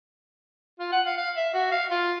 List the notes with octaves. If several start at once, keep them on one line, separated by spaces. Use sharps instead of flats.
F4
F#5
F5
F5
E5
F#4
F5
F4